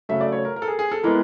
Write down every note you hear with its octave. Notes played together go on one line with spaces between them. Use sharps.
C#3 F#3 A3 E5
D5
C#5
A#4
A#4
A4
G#4
G#4
A4
E3 G#3 B3 A#4